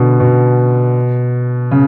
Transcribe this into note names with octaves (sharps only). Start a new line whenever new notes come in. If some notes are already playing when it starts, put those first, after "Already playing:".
Already playing: B2 D3
B2
C#3